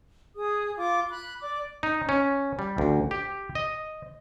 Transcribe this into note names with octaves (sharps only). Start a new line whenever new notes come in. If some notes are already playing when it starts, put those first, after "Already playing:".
G#4 D#6
F4 D6
B5 F#6
D5 D6
D#4
C#4
G3
D2
G4
D#5